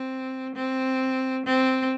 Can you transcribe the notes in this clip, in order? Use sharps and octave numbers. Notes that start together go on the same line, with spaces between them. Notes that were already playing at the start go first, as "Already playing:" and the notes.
Already playing: C4
C4
C4